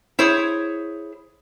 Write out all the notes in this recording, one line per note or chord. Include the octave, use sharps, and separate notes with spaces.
E4 G#4 C5 C#5